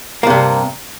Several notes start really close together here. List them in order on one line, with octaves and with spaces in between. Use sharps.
A#3 C3 G2